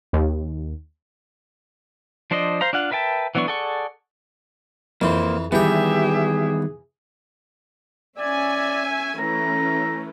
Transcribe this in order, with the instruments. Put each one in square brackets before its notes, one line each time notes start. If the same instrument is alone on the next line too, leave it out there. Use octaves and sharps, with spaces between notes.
[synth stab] D#2
[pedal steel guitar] F3 D4 C5 D5 D#5
C5 F5 A#5
D4 F4 F5 F#5
A#4 B4 E5 G5 A5
E3 F#3 B3 D4 C#6
G#4 A4 D5 F#5 C#6
[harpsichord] F2 E3 [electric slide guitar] A#3 C5
[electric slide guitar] D#3 G3 B3 [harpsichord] E3 G5 [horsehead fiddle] G4 E5 [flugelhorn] G#4
[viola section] C#4 E5 G#5 [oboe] D5
[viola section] E3 A3 C#4 [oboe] A#5